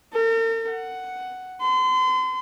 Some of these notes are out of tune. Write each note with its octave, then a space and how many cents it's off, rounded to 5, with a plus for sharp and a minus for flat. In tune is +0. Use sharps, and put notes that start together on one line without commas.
A#4 -45
F#5 +5
C6 -35